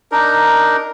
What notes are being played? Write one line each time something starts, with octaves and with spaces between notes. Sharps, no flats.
D4 D#4 A#4